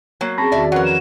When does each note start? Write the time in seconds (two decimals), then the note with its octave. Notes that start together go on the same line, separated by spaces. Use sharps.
0.21 F#3 A#3
0.38 C4 C#4 G#4 A5 B5 C#6 A#6
0.52 E2 D#3 F#4 D5 E5
0.72 F3 F#3 C#4 F#4 A#4 B4 F#5
0.85 F#5 A#5 G#6 E7